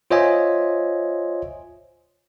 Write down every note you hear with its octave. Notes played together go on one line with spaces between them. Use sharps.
F4 C5 C#5 D#5 E5 G#5